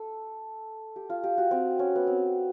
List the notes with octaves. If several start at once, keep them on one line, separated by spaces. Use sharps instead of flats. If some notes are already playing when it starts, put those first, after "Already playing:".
Already playing: A4
G4
F4
G4
F#4
C4
C#4
B3
C4